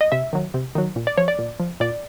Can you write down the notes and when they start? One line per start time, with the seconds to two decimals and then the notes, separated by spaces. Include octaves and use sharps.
0.01 D#5
0.12 C3 E5
0.33 D#3 F#3
0.54 C3
0.75 D#3 F#3
0.96 A#2
1.07 D5
1.17 F3 C#5
1.28 D5
1.39 A#2
1.60 F3
1.80 A#2 D5